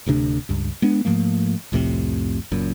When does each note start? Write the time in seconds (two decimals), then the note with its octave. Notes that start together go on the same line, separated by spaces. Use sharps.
0.06 D1 D2 C3 D4
0.49 C#2 G2
0.82 G#3 B3 D4
1.05 G#2 F3 A3 A#3
1.72 C2 F2 A2 C3
2.51 F#1 F#2 A#2